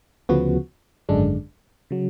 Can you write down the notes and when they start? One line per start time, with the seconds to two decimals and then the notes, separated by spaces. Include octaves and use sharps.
0.29 D2 C#3 F3 B3 F#4
1.09 G#1 F#2 D3 G#3 D4
1.91 C#3 F#3